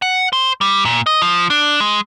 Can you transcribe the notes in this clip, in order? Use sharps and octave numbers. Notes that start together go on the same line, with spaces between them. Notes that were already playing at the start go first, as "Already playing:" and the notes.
F#5
C5
G3
A#2
D#5
F3
D4
G#3